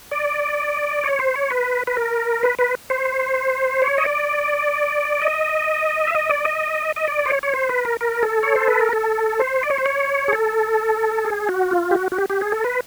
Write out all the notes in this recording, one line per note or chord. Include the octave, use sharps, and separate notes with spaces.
D5
C#5
C5
C#5
B4
B4
A#4
B4
B4
C5
C#5
D#5
D5
D#5
E5
D#5
D5
D#5
D#5
D5
C5
C#5
C#5
C5
B4
A#4
A#4
A4
C#5
C5
B4
A#4
A4
C5
D5
C#5
C5
C#5
G#4
A4
G#4
F#4
F4
G4
F#4
F#4
G4
G4
G#4
A4
B4